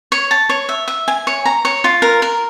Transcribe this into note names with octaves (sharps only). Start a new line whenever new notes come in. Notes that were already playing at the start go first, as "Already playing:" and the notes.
C#5
A5
C#5
E5
E5
G#5
C#5
A#5
C#5
F4
A#4
A#4